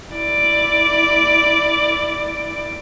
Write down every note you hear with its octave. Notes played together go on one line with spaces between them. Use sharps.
E4 D5